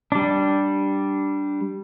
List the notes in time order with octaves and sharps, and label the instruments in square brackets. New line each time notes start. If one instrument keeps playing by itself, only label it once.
[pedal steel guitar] G3 D4